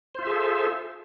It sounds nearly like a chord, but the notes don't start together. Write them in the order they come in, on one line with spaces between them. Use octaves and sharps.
C5 F4 E5 G#4 A4